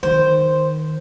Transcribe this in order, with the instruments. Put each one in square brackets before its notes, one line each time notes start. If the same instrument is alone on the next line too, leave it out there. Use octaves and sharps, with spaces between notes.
[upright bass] D#3 [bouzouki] C5